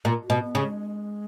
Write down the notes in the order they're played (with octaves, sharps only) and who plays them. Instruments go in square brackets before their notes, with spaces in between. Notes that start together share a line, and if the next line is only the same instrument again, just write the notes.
[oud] A#2
[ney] F#4
[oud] B2
[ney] B3
[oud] C#3
[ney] G#3